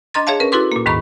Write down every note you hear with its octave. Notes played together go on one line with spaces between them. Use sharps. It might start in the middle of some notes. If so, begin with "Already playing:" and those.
D4 D#5 A#5 C6 A6
G#4 C#5 E5 F5 A5
C#4 A#4 B4
E4 F#4 A4 B4 C6 D6
A#2 A#3
D#2 G#2 D#3 A#5 B5 C#6